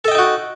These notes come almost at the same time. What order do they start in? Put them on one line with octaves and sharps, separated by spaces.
A4 D#5 G5 D#4 F#4